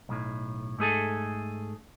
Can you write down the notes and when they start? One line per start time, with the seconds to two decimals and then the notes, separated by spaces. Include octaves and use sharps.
0.09 B1 A2
0.78 G#2 A3 G#4 A4